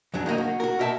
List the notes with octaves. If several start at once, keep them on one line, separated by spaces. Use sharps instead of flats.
F2 C#3 F#3 D4
D#3 F3 A#3 D#4
F#4
F#4 A#4
A#4 D#5 E5 F#5 A5